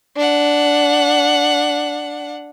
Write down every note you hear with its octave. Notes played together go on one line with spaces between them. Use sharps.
D4 F#5